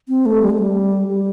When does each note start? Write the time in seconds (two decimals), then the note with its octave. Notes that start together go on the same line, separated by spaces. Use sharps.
0.09 C4
0.26 A3
0.42 G3
0.50 A3
0.58 G3
1.09 G3